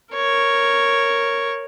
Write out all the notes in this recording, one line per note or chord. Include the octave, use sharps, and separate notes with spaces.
A#4 C#5